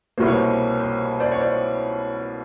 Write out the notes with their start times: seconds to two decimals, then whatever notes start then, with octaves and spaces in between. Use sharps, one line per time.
0.18 C2 B2 G3 A#3 C5
0.27 C#5
0.36 C5
0.79 C5
1.20 C5 D5
1.32 C#5
1.40 C5 D5